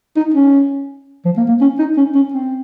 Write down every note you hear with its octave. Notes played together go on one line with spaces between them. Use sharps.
D#4
C#4
F3
A#3
A#3
C#4
D#4
C#4
C#4
C4